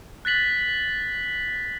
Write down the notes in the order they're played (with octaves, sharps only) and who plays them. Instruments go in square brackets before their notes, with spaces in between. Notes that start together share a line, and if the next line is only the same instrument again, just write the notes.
[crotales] F#6 A6 B6 F#7